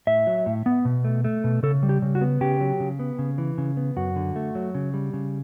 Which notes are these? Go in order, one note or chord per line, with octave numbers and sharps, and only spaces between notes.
A2 E5
F#3
A2
B3
B2
A3
A3
B2
C#3 A4
G3
G4
C#3
F#4
B3
C#3 G4
F#3
C#3
B3
C#3
E3
C#3
B3
F#2 F#4
D3
A3
F#3
C#3
G3
C#3